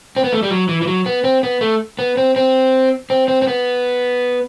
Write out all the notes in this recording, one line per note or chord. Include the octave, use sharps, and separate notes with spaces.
C4
B3
A3
G3
F#3
E3
E3
F#3
B3
C4
B3
A3
B3
C4
C4
C4
C4
C4
B3